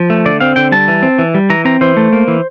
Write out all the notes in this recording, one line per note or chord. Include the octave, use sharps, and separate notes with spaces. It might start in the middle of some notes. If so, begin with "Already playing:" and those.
Already playing: F3
A3
D3 D5
C4 F5
D3 G5
G3 A5
E3
C4
E3
G3
E3 A#5
C4 A#5
E3 C5
A3
A#3
E3